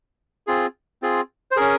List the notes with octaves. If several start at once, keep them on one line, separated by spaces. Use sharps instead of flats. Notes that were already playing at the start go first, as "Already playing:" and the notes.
C4 F4 G#4
C4 F4 G#4
C5
C#4 G#4 A#4